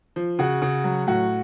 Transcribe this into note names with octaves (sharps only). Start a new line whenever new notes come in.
F3
C#3 F#4
C#3
F#3
A2 F#4